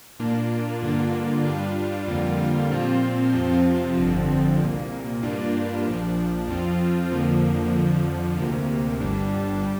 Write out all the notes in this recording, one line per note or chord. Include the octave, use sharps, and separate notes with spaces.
A#2 A#3 D4 F4
G2 D3 A#3 D4 F4
G2 G3 D4 F4
F2 D3 G3 A#3 F4
A#2 F3 C4 F4
F2 C3 F3 C4 F4
G1 F2 D3 F3 C4
C2 A#2 A#3
G2 G3 A#3 D4 F4
A#1 A#2 F3 D4
F2 F3 C4 F4
F2 D3 F3 A#3
F2 D3 F3
D2 C3 A#3
G1 G2 G3 D4
G3